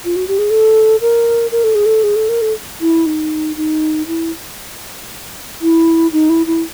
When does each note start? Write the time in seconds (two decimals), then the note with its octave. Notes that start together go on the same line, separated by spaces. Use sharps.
0.05 F4
0.16 F#4
0.28 G4
0.38 G#4
0.50 A4
1.01 A#4
1.52 A#4
1.64 A4
1.75 G#4
1.86 A4
2.03 G#4
2.16 A4
2.29 A#4
2.41 A4
2.81 E4
3.06 D#4
3.56 D#4
4.07 E4
5.61 E4
6.12 D#4
6.29 E4
6.46 E4